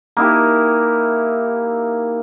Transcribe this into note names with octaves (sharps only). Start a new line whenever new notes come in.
A#3 D#4 E4 G4